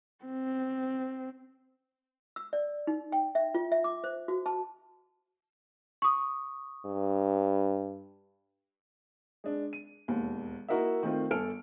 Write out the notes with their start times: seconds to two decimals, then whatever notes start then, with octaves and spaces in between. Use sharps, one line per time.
0.25 C4
2.36 E6
2.53 D5
2.87 D#4
3.12 G5
3.35 E5
3.54 F4
3.72 E5
3.84 D6
4.04 C5
4.28 F#4
4.46 A5
6.02 C#6 D#6
6.86 G2
9.44 G#3 D4
9.73 D#7
10.08 E1 D#2
10.68 A#3 E4 F#4 A#4 D#5 E5
11.03 D#3 A3 C4 F4
11.31 G1 A4 G#5 F6 D7